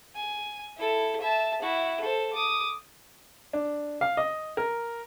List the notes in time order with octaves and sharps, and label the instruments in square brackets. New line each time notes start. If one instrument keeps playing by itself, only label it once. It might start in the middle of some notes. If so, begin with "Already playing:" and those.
[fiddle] G#5
E4 A4
E5 A5
E4 F#4
A4 C5
D6 D#6
[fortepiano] D4
F5
D#5
A#4